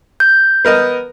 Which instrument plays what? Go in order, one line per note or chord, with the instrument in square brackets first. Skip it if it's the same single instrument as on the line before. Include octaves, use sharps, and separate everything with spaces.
[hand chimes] G6
[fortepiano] B3 A#4 D#5